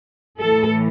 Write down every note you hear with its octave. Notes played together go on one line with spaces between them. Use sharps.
A2 E3 A4